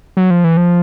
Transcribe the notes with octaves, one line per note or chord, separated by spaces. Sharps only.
F#3
F3
E3
F3